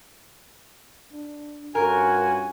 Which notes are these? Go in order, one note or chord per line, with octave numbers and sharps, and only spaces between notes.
D4
G2 C#4 F4 F#4 A#4 G#5